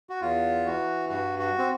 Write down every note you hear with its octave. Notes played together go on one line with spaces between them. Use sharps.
F#4
E2 F4
E3 F#4
G2 F#4
F#4
C4